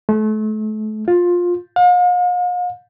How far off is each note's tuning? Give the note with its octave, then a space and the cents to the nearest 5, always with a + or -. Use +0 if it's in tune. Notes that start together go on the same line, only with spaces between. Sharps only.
A3 -35
F4 +15
F5 +45